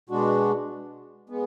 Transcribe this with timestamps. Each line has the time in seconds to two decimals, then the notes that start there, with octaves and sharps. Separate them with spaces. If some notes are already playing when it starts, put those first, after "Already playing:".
0.09 B2 G#3 D4 F#4
1.30 G#3 B3